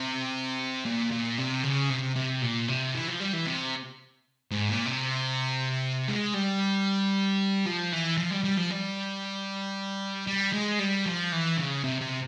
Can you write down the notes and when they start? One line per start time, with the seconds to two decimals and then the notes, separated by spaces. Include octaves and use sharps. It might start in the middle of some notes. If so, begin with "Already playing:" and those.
Already playing: C3
0.85 A#2
1.11 A#2
1.38 C3
1.63 C#3
1.89 C3
2.16 C3
2.42 A#2
2.68 C3
2.95 E3
3.08 F3
3.20 G3
3.33 E3
3.47 C3
4.51 G#2
4.69 A#2
4.86 C3
6.08 G#3
6.34 G3
7.66 F3
7.92 E3
8.17 F3
8.31 G3
8.44 G3
8.57 F3
8.70 G3
10.27 G3
10.53 G#3
10.80 G3
11.06 F3
11.32 E3
11.57 C#3
11.84 C3
12.01 C3